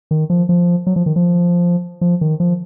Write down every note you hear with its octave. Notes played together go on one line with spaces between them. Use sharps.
D#3
F3
F3
F#3
F3
D#3
F3
F3
D#3
F3